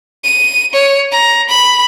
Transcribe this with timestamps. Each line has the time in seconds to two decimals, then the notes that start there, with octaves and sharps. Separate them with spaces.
0.24 D#7
0.73 C#5
1.12 A#5
1.49 B5